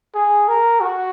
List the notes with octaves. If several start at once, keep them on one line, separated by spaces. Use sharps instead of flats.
G#4
A#4
F#4